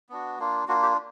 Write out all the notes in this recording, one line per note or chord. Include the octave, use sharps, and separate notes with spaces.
B3 D4 F#4
A#3 D4 F4
A#3 D4 F4 F#4
G4